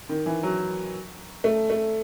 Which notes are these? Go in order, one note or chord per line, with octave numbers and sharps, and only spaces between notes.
D#3
E3
F#3
A3
A3